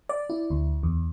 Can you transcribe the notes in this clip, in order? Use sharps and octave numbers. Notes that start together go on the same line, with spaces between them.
D5
E4
D2
E2